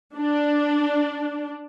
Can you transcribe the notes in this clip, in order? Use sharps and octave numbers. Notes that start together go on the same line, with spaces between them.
D4